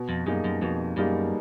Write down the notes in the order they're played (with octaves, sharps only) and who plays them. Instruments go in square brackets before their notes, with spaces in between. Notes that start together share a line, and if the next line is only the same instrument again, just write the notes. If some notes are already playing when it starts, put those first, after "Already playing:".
Already playing: [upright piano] B2
[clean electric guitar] F2
[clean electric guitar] F#2 [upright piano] G3 A#3 D#4 G#4
[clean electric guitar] F#2
[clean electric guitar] F2 [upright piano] B2
[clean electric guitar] F#2 [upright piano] G3 A#3 D#4 G#4